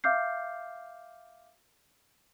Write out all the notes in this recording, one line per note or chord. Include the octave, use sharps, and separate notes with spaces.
E5 F5 D6 F6 G6 C7